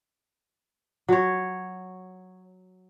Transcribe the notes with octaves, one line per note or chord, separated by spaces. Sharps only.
F#3 C#5